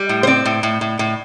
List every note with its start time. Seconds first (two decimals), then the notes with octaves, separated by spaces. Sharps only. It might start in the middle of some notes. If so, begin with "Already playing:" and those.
Already playing: G3
0.09 A2
0.23 C5
0.27 C4 D5
0.45 A2
0.63 A2
0.81 A2
0.99 A2